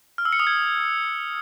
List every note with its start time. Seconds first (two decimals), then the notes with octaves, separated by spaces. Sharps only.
0.18 F6
0.25 E6
0.32 C#7
0.40 D#6
0.47 G#6